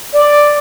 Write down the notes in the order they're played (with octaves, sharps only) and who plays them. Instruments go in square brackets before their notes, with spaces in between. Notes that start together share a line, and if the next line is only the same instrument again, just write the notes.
[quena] D5